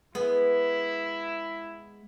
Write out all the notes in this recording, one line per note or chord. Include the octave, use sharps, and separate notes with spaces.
G#3 B3 E4